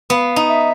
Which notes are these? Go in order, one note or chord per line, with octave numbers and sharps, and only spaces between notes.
B3 F5
D#4
E5